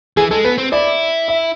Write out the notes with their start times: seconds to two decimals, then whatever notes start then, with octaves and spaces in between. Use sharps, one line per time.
0.17 E3 G#4
0.31 G#3 A4
0.44 B3 B4
0.58 C4
0.72 E4 D5
1.28 E5